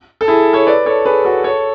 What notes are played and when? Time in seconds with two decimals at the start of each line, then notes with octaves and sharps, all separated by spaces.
0.21 A4
0.28 E4 G#4
0.53 A4 C#5
0.67 B4 D5
0.86 A4 C#5
1.05 G#4 B4
1.25 F#4 A4
1.44 A4 C#5